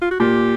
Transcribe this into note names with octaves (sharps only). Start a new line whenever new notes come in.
F4
F#4
A#2 G4